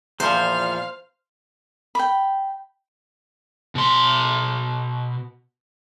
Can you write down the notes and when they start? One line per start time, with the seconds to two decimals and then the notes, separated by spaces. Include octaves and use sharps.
0.20 E2 A#2 F3 C5 F5
1.95 G5 B5
3.75 B2 C6